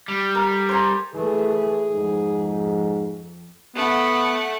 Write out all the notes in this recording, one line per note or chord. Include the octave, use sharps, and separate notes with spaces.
G3
A#4
C5 G#5 A#5
E3 A3 G#4
F2 G#2
A3 B3 F#5